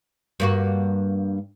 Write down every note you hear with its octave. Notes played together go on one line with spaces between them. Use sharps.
G2 A#3 F#4